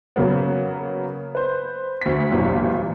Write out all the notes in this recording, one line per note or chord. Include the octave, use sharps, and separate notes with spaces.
C#3 F#3 A#3 B3
B4 C5
D2 B6
G#1 E2 G2 A#2 E3 F#3